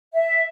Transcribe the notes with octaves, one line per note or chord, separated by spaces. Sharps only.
E5